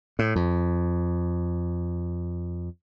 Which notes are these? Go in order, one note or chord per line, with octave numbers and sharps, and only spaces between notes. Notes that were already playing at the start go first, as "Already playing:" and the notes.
A2
F2